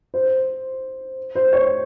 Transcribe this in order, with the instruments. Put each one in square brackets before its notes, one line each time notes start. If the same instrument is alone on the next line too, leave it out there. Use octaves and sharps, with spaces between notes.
[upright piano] C5
C5
C#5